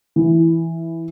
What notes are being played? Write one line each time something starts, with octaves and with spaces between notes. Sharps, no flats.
E3